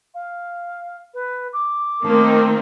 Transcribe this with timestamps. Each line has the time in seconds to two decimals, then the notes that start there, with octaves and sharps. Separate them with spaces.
0.14 F5
1.14 B4
1.53 D6
2.05 D#3 A3 A#3 C4